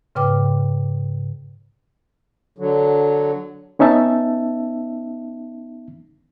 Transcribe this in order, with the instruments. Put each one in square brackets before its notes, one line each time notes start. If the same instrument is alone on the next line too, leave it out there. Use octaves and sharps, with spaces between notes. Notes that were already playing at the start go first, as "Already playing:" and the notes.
[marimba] G#2 C#3 B4 G5 D6
[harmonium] D3 F#3
[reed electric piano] B3 C#4 D#4 E5 A5